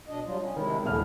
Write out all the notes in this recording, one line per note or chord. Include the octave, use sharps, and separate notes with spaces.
B2 D4 D#5
F#3 G3 F4
C#4
C3 D#3 G#3 E4
D#1 C2 D3 F6